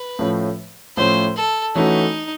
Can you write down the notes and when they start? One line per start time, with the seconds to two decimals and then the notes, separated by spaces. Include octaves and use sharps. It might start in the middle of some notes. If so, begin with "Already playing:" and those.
Already playing: B4
0.19 A2 F3 A3 C#4
0.97 A2 F3 A3 C#4 C5
1.36 A4
1.75 E3 A3 C#4 D#4 F#4